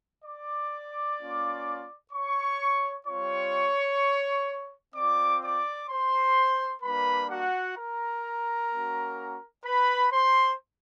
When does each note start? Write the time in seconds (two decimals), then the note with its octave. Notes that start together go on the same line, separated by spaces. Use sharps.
0.24 D5 D6
1.19 A#3 C#4 F4
2.12 C#5 C#6
3.06 G3 C4 F4 C#5 C#6
4.95 C4 F4 D5 D6
5.42 D5 D6
5.89 C5 C6
6.82 G3 A#3 D4 B4 B5
7.30 F#4 F#5
7.76 A#4 A#5
8.71 A#3 C#4 F#4
9.65 B4 B5
10.12 C5 C6